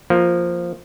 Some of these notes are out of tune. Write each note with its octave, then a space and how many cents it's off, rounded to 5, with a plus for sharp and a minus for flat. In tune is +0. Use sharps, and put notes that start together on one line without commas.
F3 +0 A#3 +0